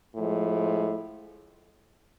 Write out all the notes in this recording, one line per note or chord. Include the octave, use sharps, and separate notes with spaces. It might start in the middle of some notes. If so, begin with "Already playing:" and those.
A2 F3 G#3